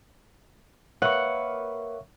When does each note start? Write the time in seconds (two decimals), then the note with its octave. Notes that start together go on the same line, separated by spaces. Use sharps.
1.02 A#3 B4 C#5 E5 F#5 C#6